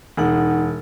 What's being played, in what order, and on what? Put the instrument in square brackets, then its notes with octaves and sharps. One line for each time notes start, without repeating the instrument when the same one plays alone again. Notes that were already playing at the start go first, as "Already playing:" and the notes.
[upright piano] E1 [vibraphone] D#4 F#5